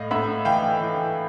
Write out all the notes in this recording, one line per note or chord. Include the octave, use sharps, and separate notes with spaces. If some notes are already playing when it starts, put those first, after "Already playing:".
Already playing: A2 D#5 F5
A2 E5 F#5
E3 F5 G5
E3